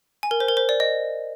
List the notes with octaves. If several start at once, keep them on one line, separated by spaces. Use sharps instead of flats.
G#5
A#4
C5
A#4
C5
D5
D#5